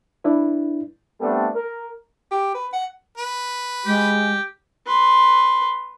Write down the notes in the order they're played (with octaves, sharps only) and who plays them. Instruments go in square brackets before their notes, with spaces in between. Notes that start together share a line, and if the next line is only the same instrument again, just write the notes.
[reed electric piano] D4 E4 B4
[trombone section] G3 A3 B3 C4 D4 A4
A#4
[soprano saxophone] G4
B4
F#5
[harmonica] B4
[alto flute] G#3 [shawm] G4
[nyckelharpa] B4 C6